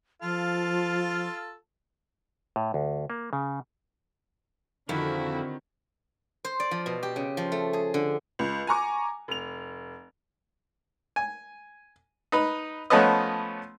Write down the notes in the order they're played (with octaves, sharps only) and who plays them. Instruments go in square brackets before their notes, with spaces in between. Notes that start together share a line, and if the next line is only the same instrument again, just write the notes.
[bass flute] F3 [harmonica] F4 A4 F5
[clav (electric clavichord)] A2
D2
A#3
C#3
[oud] F2 [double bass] D3 [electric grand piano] D#3 B5 [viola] E4 F#4
[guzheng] C5
D5
F3
B2
G4
C#3
F3
A3
G#4
D3
[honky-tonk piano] C#2
G#5 A#5 C#6 D6
F1 F7
[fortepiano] G#5
D#4 B4
F3 A3 B3 C#4 B4 D#5